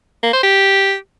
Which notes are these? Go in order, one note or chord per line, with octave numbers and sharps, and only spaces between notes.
A#3
C5
G4